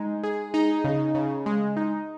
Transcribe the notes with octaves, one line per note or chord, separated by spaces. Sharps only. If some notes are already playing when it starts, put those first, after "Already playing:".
Already playing: G#3 D#4
G#4
D#4
C#3
C#3
G#3
D#4